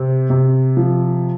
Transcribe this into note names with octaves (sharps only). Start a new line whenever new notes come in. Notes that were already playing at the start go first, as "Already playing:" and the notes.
Already playing: C3 C4
C3
F3